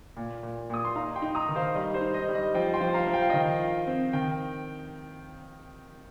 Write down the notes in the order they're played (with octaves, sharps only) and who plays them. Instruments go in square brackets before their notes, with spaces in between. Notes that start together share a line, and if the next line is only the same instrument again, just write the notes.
[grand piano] A#2
A#2
A#2 D#6
C6
D#4 F5 A#5
G5 C6
D#4
A#5 D#6
D#3
C5 F5
G3 D#5
C5
D#4
D#5
G3
D#5
F3 D#5 G5
G5 C6
F3
F5 A#5
F3
G5
F5
D#3 D#5 G5
F4
C4
D#3 G5